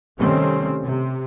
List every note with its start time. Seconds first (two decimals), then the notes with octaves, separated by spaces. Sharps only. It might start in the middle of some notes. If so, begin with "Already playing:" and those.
0.18 C3 D#3 G3 A3 C4 C#4
0.85 C3